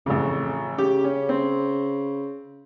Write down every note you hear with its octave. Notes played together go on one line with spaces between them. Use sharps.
A1 F2 C#3
C#3 G4
C#4
C4